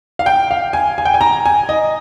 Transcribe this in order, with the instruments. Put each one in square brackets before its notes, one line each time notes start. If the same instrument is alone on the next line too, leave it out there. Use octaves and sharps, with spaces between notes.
[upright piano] F5
G5
F5
G#5
G#5
G5
G#5
A#5
G#5
D#5